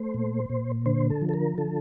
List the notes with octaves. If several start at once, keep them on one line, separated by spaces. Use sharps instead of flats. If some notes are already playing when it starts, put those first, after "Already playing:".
Already playing: A3 C5
A#2
A#2
D3 C5
A4
F3
A4
A#4
D3 A4